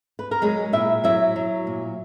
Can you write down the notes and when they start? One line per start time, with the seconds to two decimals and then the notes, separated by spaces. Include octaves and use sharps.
0.19 B4
0.31 A#4
0.41 F#3 G#3 G#4
0.73 A#2 E4 E5
1.04 F#3 E4 E5
1.36 F#3
1.67 A#2